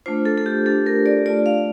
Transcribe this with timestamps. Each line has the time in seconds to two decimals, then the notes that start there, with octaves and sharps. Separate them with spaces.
0.06 A3 D4 F4 C5
0.25 A4
0.38 A4
0.46 G4
0.66 A3 D4 F4 A4
0.86 A#4
1.06 D5
1.26 A3 D4 F4 D5
1.46 F5